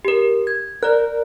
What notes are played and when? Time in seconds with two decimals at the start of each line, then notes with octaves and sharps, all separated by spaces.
0.05 G4 A#4
0.47 G#6
0.83 A#4 D5 F#6